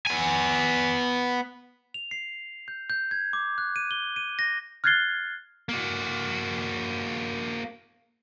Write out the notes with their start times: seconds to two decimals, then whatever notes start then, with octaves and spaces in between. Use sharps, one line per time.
0.07 B3 G#5
1.94 F7
2.11 C7
2.68 G6
2.90 G6
3.11 G#6
3.33 D6
3.58 F#6
3.76 D#7
3.91 G7
4.16 D#7
4.39 A#6
4.84 F6 F#6 G#6 A6 C7 G7
5.69 A#3 F#4